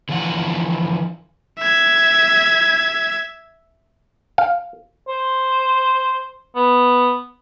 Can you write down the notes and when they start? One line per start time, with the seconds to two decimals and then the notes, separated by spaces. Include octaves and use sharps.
0.09 D3 E3 F3 F4 F#5
1.59 E5 G#6
4.38 F5
5.08 C5
6.55 B3